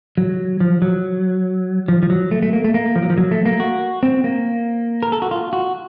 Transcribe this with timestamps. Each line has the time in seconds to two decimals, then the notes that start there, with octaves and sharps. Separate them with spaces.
0.18 F#3
0.60 F3
0.82 F#3
1.88 F3
2.03 F3
2.10 F#3
2.31 A3
2.42 A3
2.53 A#3
2.64 A3
2.74 A#3
2.96 F3
3.03 F#3
3.10 F3
3.18 F#3
3.31 A3
3.46 A#3
3.60 F#4
4.03 C4
4.24 A#3
5.03 A#4
5.12 A4
5.22 F#4
5.31 F4
5.53 F#4